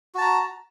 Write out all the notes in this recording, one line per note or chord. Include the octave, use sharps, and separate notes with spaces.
F#4 A5 A#5